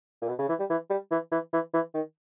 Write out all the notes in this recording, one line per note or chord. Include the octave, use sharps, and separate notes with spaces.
A#2
B2
C#3
E3
G3
E3
G3
E3
E3
E3
E3
D#3